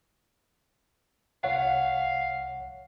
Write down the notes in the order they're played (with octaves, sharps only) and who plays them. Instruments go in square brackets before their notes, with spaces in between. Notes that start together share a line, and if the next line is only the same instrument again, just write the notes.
[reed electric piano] C2 C#5 F#5 [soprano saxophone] F5